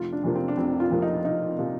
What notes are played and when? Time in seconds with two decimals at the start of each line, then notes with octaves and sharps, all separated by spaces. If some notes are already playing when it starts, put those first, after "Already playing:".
Already playing: F1 F4
0.13 D4
0.24 F2 C3 F3 A#3
0.35 C4
0.48 D4
0.57 F1 C4
0.80 F4
0.91 F2 C3 F3 A#3
1.02 D#4
1.25 F1 D#4
1.58 C3 F3 A#3